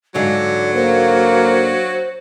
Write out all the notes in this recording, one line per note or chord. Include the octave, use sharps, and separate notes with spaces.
G#2 D3 F#3 D5 F5
A#3 C5